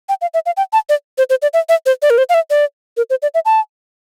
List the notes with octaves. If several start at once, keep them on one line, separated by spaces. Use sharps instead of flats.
G5
F5
E5
F5
G5
A5
D5
C5
C5
D5
E5
E5
C5
D5
A#4
C5
F5
E5
D5
A#4
C5
D5
E5
A5